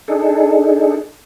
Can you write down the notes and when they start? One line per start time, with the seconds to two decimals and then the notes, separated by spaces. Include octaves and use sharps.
0.08 D4 D#4 G#4 A4